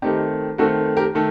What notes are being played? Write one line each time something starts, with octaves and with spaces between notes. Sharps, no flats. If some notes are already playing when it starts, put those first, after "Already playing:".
D#3 A3 C4 D#4 G4
D#3 A3 C4 F#4 A4
G4 A#4
D#3 A3 A4